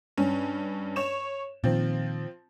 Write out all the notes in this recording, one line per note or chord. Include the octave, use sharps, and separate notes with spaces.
G2 C#4
C#5 E7
A#2 D#3 F3 C4